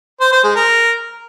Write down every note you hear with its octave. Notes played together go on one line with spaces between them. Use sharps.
C5
C5
G#3
A#4